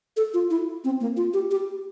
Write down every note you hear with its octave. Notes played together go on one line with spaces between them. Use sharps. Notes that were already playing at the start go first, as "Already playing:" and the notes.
A4
F4
E4
C4
A#3
F4
G4
G4